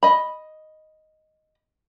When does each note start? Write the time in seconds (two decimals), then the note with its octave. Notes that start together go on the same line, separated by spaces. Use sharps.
0.03 D#5 B5